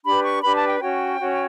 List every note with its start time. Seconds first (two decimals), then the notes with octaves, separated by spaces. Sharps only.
0.04 D4 G4 B4 B5
0.23 C#6
0.43 D4 G4 B4 B5
0.55 A5
0.68 G5
0.81 C#4 F#4 C#5 G5
1.19 C#4 F#4 C#5